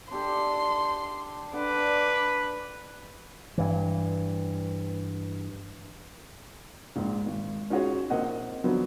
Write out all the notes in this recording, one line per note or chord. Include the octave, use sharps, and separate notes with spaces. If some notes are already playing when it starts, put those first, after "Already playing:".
D4 G4 A4 C6
D3 D4 B4 D6
G2 E3
A#1 G#2
G#1
C#4 D#4 F4 F#4 G#4 C#5
A#1 A#3 C4 D#5 F#5
D3 F3 F#3 B3 C4